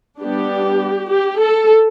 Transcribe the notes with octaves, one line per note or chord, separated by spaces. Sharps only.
G3 B3 D4 G4
G4
A4